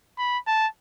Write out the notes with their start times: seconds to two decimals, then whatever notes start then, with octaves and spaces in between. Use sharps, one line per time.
0.18 B5
0.47 A5